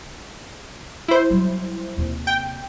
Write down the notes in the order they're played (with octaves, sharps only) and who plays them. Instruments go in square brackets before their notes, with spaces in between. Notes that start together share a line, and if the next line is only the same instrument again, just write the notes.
[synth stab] E4 C5
[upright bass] F#3 G3
D#2 C3
[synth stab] G5